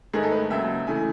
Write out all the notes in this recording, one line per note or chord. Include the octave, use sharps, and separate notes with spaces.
G#2 D#3 A3 D#4 G#4
A4
B4
D#2 C#3 F#3 E5
C#3 E3 A3 G#5